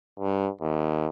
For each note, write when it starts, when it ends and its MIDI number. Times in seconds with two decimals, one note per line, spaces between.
0.19 0.48 43
0.61 1.07 39